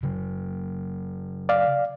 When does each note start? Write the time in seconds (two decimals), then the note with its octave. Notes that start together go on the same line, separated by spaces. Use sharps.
0.03 C#3 F#3
1.49 D5 F5